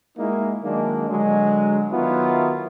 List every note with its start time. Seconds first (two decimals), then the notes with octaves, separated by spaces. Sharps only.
0.18 G#3 A#3 D#4 E4 F#4
0.63 D#3 F#3 G#3 A#3 D4
1.10 D3 F#3 G#3
1.91 D#3 F#3 B3 E4 F4